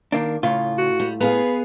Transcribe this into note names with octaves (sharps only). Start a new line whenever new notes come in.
D#3 A#3 D4
A2 C#3 F4
F#4
G3
B3 G#4 B4 F5